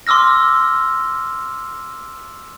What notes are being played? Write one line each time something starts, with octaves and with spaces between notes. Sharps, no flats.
C6 D6 E6 F6 A#6